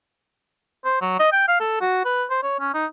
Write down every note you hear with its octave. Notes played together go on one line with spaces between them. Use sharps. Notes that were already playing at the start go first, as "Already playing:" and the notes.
C5
F#3
D#5
G5
F5
A4
F#4
B4
C5
C#5
C#4
D#4